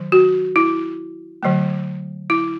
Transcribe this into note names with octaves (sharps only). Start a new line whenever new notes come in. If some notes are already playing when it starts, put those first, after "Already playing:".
Already playing: D#3 F#3
F#4
E4
D3 F#3 A3
E4